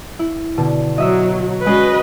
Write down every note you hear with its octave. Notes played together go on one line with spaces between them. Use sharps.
E4
B2 D3
F#3 D#5 E5 E6
G#3 C#4 F#4 B4 D#5 C7